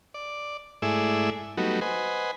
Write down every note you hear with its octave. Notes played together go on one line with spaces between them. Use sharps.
D5
G#2 A3 E4 G#4 D5 E6
F#3 G3 A3 B3 D#4 F#4
B4 C5 D#5 F#5 G#5